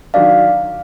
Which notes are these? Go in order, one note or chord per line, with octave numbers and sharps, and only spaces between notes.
D#3 F#3 D4 D5 F5